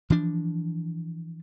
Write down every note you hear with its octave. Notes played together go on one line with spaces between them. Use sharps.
E3 F3 D4